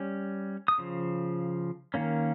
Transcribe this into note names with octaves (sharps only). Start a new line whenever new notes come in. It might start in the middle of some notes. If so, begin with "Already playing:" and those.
Already playing: G3 C#4
D#6
C#3 F3
D#3 A#3 C#4